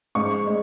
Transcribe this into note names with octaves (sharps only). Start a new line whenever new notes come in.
G#2 G#3 C#4 C#6
G#3